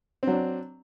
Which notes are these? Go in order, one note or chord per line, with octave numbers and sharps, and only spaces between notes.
F#3 C4 D4